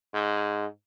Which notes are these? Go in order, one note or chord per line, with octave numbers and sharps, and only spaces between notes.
G#2